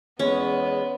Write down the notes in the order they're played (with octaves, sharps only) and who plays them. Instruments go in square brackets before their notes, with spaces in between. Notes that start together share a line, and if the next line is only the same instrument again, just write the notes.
[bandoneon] E2 G#3 [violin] B3 [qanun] C#4